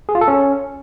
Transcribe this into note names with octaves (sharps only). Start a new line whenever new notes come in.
G#4
F4
A4
C#4